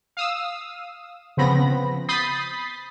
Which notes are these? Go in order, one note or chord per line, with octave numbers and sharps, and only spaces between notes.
F5 D#6 E6
C#3 F3 B3 C4 B5 A#6
B5 D#6 G6 A6 B6 C7